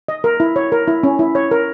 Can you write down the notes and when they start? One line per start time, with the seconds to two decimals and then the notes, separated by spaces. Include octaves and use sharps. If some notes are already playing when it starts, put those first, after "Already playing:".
0.08 D#5
0.24 A#4
0.40 E4
0.56 C#5
0.72 A#4
0.88 E4
1.03 C#4
1.19 E4
1.35 C#5
1.51 A#4